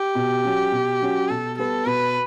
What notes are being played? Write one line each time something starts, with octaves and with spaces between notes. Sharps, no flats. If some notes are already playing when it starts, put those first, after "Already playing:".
Already playing: G4
B2
F#3 C#4 F#4
B2
F#3 C#4 F#4
B2 A4
G3 B3 A4
B2 B4